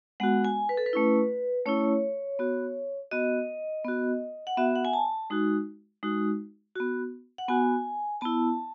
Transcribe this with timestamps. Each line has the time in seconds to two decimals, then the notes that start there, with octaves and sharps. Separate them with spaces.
0.20 G#3 B3 F#4 F#5
0.45 G#5
0.69 B4
0.77 A4
0.86 B4
0.93 A3 C#4 E4
1.66 A3 C#4 E4 C#5
2.39 B3 F#4
3.11 B3 F#4 D#5
3.85 B3 F#4
4.47 F#5
4.57 B3 F#4 E5
4.76 F#5
4.85 G#5
4.93 A5
5.30 G#3 D#4 F#4
6.03 G#3 D#4 F#4
6.75 B3 F#4
7.38 F#5
7.48 B3 F#4 G#5
8.21 B3 E4 A5